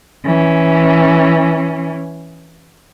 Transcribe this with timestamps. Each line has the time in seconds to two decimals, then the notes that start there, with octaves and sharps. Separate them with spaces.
0.25 E3 C#4